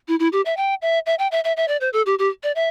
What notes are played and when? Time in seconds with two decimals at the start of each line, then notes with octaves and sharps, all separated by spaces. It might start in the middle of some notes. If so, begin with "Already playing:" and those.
0.08 E4
0.20 E4
0.32 G4
0.45 E5
0.57 G5
0.82 E5
1.06 E5
1.19 G5
1.31 E5
1.44 E5
1.57 E5
1.68 D5
1.81 C5
1.93 A4
2.06 G4
2.19 G4
2.43 D5
2.55 E5